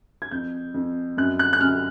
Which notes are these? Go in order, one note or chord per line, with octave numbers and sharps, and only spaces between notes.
G#6
F2 G6
F2
F#2 F#6
F#6
F#6
F#2 F6